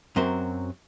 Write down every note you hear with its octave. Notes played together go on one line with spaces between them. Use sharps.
F#2 F#3 C4 A#4 C5